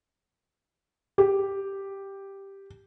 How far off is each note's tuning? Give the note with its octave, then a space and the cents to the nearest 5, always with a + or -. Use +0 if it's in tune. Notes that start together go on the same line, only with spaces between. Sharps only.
G4 +0